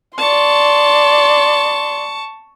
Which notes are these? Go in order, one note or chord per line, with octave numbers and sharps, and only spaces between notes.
D5 A5 C6 C#6